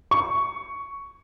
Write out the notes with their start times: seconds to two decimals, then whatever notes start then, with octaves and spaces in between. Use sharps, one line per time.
0.11 C#6